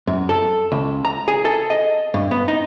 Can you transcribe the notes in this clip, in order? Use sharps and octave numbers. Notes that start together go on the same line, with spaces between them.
F#2
A4
C#2
A#5
G#4
A4
D#5
G2
B3
D#4